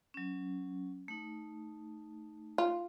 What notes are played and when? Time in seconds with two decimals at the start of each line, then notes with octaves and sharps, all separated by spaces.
0.14 F#3 C#4
1.08 A3 D#4
2.58 F4